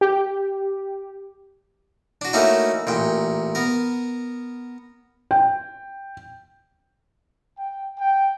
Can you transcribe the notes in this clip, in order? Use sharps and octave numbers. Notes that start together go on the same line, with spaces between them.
G4
D4 F#4
A3 A#3 C#4 D#4 E4 F#4
A1 A#2 G5
B3 A#4
G5
G5
G5